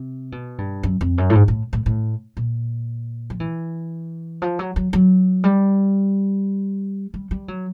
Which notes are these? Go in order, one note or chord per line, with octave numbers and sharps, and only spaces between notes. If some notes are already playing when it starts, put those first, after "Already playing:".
Already playing: C3
B2
G2
F#2
F2
F#2
A2
G#2
A2
A2
A2
A#2
F3
E3
F3
F#3
F#3
F#3
G3
G3
G3
F#3